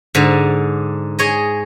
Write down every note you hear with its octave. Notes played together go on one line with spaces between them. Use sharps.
G#2 D3
G#4 C#5 D#5